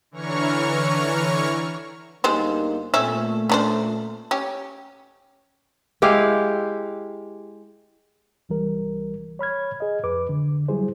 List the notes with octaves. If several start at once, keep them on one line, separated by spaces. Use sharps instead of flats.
D3 E3 C#5 A#5 C#6 F6
G1 G3 G#3 A#3 D#4 C5
A#2 A3 C4 C#4 E5
C#4 D4 C5
C#4 G4
G#3 E4 G4 F5
C2 E3 G3 A#4
C#5 B5 F6 G#6
G#4 D#5
F2 B4 D6
D3
F#3 G3 E4 G#4 C5